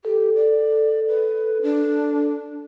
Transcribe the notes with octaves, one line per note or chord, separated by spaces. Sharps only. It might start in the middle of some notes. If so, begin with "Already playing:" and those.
G4 A4
D5
B4
D4